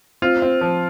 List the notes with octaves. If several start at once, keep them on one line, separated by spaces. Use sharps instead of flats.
C4 F4
C4
F3